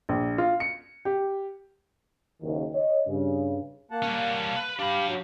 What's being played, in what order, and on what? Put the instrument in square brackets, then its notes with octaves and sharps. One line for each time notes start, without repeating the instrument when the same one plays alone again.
[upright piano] A#1
F4
C#7
G4
[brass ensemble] F#1 D#2 D#3
C#5 D#5
G2 C#3
[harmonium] A#3 F#5 A5
[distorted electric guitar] G3 C#4
B4
[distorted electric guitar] D4 B5 [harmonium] G4 F5
[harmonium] F#3